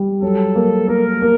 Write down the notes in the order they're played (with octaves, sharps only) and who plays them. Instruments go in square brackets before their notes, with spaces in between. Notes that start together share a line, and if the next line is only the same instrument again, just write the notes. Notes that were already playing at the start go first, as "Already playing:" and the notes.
Already playing: [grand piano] G3
[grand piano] F#3 [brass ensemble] A4
[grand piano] A#3
[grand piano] A#3 [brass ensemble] A#4
[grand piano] A#3